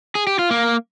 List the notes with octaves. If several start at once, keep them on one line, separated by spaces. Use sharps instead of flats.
G#4
G4
F4
A#3